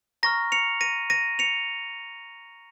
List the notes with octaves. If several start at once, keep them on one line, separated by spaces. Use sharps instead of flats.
A#5 C#6 F6 A#6
C#7 F7
A#6 D#7
A#6 D#7
C#7 F7